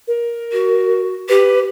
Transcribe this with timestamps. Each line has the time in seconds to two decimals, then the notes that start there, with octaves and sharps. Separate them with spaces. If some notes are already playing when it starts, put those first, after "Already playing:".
0.08 A#4
0.53 F#4
1.29 G4 B4